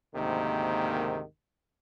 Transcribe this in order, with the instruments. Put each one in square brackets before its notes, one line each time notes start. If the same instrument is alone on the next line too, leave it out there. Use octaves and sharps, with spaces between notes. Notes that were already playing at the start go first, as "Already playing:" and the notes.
[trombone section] D2 G#2 C3 D#3 A#3